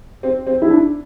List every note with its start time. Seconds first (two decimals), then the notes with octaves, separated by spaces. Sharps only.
0.23 C4
0.47 C4
0.62 E4
0.70 D4